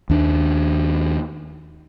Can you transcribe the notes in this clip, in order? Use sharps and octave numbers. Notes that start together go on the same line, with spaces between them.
D#2 D4